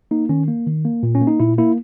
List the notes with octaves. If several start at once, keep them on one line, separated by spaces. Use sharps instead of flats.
A#3 D#4
D#3 C#4
A#3
D#3
A#3
A#2
C#4
A#3
D#4
A#2 E4
A#3 E4